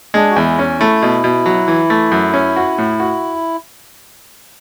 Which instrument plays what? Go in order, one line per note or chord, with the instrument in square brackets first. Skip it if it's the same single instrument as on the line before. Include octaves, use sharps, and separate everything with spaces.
[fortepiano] G#3 [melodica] D4
[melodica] F#4
[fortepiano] E2 [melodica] E4
[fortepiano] C#4
[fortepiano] A3 [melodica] E4
[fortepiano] B2
B2
F#3
E3
A3
F#2
C#4
F#4
A2
F#4